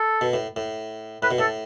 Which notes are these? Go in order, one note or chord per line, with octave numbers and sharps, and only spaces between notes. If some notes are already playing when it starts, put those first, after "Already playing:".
Already playing: A4
B2
A2
A2
A2 B4
B2
A2 A4